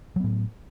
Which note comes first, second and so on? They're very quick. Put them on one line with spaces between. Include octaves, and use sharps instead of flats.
F#3 B3 A2